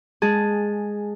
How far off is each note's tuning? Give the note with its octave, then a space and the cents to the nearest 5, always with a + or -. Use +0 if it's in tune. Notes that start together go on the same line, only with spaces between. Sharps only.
G#3 -10 G#4 +0 A5 +0